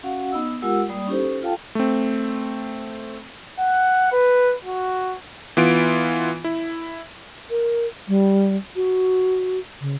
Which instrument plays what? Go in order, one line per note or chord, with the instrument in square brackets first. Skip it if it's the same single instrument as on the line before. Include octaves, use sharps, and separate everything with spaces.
[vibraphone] C#4 F#4 F5 F#5
B3 D#4 D#5 E6
G#3 F4 G4 A#4 F#5 E6
G3 A#3 D5 B5 D#6
C#4 D#4 E4 G4 A4 C5
F4 A4 F5 G5 A5
[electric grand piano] A3 C4
[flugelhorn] F#5
B4
F#4
[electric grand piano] E3 B3 F4 D7
E4
[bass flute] A#4
G3
F#4
C#3